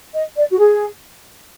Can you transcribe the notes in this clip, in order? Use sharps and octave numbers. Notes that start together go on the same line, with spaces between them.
D#5
D5
F#4
G#4